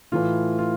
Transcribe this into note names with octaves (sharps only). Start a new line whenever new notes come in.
A2 E3 A3 F4
F4